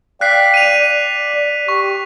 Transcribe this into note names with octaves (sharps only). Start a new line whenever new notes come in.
D5 F5 G5 F#6 B6 C7
D#7 F7
D5
G4 C#6